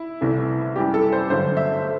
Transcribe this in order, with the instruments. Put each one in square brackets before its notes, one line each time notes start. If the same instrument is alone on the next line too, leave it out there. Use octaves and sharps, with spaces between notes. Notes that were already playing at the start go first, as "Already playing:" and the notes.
Already playing: [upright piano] E4
C2 C3 E3 A3
F#2 E3 G3 G4
A4
C5
G2 D3 F#3 A3 C5
E5
A3